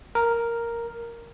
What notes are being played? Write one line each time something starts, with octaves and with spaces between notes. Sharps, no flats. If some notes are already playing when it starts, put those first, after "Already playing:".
A#4